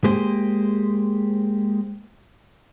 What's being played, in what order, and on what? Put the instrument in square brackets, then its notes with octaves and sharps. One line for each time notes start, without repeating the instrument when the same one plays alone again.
[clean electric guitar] G#3 A#3 G4 G#4 C5